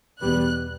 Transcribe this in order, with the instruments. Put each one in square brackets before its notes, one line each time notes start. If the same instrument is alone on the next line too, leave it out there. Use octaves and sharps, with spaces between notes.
[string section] E2 B2 G3 B3 F#6